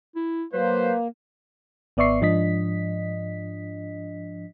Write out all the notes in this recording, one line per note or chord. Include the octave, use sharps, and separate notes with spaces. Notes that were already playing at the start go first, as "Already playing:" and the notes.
E4
F#3 A#3 B4 C5
G#1 B3 D5 E5 C#6 C7
G#2 F3 D4 D#5 B6